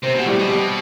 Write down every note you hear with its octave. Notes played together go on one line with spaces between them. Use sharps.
C3 C4 C5
B2 F#4
A2 G3 G4
B2
G3 G4